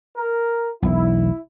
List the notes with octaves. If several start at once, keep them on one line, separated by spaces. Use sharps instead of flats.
A#4
E1 B1 E4